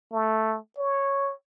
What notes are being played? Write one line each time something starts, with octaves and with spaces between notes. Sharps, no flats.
A3
C#5